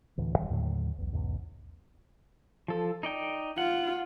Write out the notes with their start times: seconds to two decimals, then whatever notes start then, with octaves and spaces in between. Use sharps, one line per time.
0.18 D2 A2 E3
0.36 F1 D#3 G3
0.50 D#2 A2 D3 F#3
0.98 B1 E2
1.12 B1 E2 G#2 C#3
2.68 F3 A4
3.03 D#4 D5 G5
3.58 F4 F#5